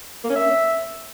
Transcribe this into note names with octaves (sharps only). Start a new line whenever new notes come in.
A#3
C#4
E5